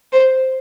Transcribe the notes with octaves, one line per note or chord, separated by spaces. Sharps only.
C5